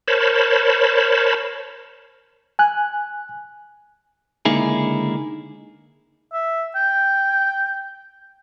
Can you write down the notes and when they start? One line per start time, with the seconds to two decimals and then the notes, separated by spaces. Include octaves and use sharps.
0.08 A#4 C5 C#5 A5 B5
2.59 G#5 F#6
4.45 C#2 D3 A#3 D#4 E4 G#4
6.33 E5
6.76 G5